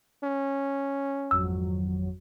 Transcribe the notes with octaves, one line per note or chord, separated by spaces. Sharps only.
C#4
G#1 F2 F#3 E6